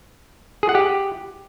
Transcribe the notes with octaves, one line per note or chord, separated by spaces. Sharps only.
G#4
F#5
G4